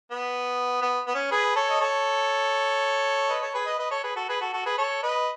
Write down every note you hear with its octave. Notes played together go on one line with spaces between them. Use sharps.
B3
B3
B3
C#4
G#4 B4
A4 C#5
D#5
A4 C#5
B4 D#5
A4 C#5
G#4 B4
B4 D#5
B4 D#5
A4 C#5
G#4 B4
F#4 A4
G#4 B4
F#4 A4
F#4 A4
G#4 B4
A4 C#5
B4 D#5